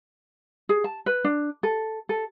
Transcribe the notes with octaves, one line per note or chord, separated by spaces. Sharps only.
G#4
A5
B4
D4
A4
A4